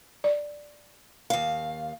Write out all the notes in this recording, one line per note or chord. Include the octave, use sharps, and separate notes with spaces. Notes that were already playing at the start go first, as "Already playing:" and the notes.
D5
D#2 F5